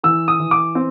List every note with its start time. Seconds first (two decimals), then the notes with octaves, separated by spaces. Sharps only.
0.03 E3 E6
0.28 D#6
0.40 E3
0.51 D6
0.75 C4